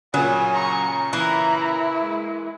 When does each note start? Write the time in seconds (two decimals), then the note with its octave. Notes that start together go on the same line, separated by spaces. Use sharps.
0.14 A#2 C#3 F#3 G#5
0.53 A#5 C#6
1.13 E3 A#3 E4 A#5 B5
2.02 G#3